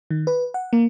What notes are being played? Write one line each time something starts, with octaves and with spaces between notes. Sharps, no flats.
D#3
B4
F#5
A#3